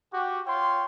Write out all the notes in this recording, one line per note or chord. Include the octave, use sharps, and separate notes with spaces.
F#4 G4
F4 C#5 G5 C6